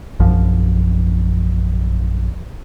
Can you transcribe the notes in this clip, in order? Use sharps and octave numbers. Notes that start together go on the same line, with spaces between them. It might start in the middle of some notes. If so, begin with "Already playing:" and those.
A#1 F#2 F3